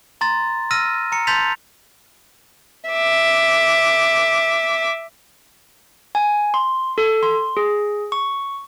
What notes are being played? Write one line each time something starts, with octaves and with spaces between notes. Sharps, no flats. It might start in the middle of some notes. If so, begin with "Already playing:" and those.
A#5 C6 A6
E6 F6 A#6 D#7
A#5 C#7
A5 C6 G6 A6 B6 F7
E5 D6
G#5
C6
A4
C6
G#4
C#6